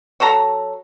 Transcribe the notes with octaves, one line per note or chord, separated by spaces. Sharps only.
F#3 F#4 A4 A#5